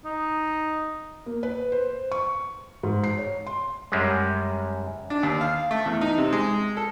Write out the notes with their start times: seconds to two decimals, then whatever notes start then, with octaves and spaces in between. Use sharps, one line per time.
0.05 D#4
1.26 A#3
1.43 B4
1.72 C5
2.12 C#6
2.83 G#2
3.04 C7
3.18 C#5
3.47 C6
3.92 F#2 G3 G#3
5.10 D4
5.23 D#2
5.41 F5
5.71 A3
5.86 E2
6.01 D#4
6.18 C3
6.33 G#3
6.77 A4